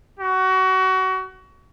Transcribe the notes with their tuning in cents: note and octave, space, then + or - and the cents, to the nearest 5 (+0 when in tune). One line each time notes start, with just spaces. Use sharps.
F#4 +25